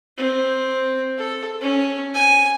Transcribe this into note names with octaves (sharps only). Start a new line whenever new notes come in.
C4
A4
C#4
G#5